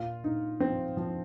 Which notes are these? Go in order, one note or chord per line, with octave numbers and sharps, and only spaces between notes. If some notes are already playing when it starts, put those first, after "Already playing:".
Already playing: A#2 F4
A#2 D#4
F3 C4
F3